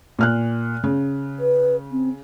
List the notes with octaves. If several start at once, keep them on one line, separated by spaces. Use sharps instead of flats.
A#2 F6 F#6
C#3
B4
C4